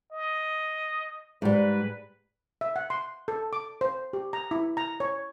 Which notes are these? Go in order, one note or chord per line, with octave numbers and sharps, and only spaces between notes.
D#5
G#2 G3 B4
E5
F#5
C6
A4
D6
C5
G4
A#5
E4
A#5
C#5